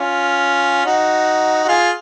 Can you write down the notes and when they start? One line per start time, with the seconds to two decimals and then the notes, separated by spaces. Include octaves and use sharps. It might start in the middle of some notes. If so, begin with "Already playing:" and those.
Already playing: C#4 F4
0.86 D#4 F#4
1.65 F#4
1.68 F4 G#4